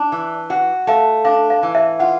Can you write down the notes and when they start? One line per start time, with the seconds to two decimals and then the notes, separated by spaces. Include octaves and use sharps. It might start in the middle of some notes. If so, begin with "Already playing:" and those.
Already playing: D4
0.12 E3
0.50 F#4 F#5
0.87 A3 F5
1.24 D4 F5
1.50 F5
1.63 E3
1.75 E5
2.00 F4 F#5